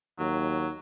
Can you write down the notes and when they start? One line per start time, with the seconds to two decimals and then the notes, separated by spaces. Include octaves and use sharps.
0.19 D#2 F#3